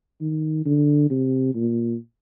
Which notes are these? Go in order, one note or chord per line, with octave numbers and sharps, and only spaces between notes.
D#3
D3
C3
A#2